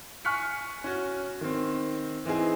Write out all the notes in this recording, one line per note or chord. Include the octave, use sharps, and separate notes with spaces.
G#5 C#6 F6 F#6 B6 C#7
C#4 F#4
D#3 C4
E3 C4 D#4 G#4